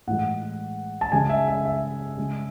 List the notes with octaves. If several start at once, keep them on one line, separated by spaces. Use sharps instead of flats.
A2 E3 G#3 F#5
A5
C#3 G#3 G#5
E5
E5
E5
C#3 G#3